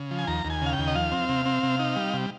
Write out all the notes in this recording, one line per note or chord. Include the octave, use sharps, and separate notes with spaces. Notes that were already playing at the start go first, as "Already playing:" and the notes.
Already playing: C#3
F3
G#5
D#2 A#5
D#2
G#5
C#3 F5
G5
D#2
D#5
F3 F5
C4
C3
C4
C3
D#4
G3
C3